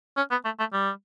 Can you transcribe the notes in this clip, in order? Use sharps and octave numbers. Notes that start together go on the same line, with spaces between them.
C#4
B3
A3
A3
G3